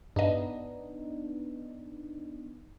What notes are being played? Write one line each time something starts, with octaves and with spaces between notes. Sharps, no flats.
G2 B3 D4 D#4 D#5